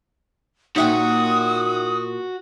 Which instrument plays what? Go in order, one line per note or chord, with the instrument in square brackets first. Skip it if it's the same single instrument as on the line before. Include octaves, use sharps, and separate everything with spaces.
[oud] A#2 F#3 [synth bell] D#4 E5 G5 [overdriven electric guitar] F#4 [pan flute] D#6